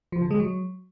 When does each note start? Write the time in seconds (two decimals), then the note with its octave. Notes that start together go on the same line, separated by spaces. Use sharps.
0.12 F3
0.21 D3
0.31 G#3
0.40 F#3